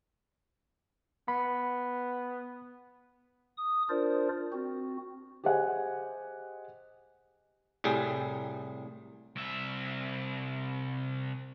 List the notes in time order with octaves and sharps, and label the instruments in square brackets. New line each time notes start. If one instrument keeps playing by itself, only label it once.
[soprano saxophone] B3 [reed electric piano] B5
[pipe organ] D#6
D4 F4 A#4 C5 D5
C4 F#4
[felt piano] G4 G#4 C5 D#5 F#5 G#5
[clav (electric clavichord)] C2 A2 G3 G#4
[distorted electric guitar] C2 E5